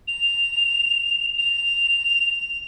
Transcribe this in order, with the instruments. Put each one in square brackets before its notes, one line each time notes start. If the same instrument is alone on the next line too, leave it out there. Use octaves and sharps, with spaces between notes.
[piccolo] F7
F7